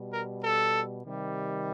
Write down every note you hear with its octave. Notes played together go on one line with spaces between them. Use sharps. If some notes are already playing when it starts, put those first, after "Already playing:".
Already playing: B2 G3
A#4
A4
C3 D#3 G3